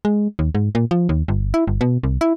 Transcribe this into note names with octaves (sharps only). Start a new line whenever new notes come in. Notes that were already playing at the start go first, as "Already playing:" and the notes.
G#3
D#2
G#2
A#2
F3
D#2
G1
E4
G1
B2
C2
E4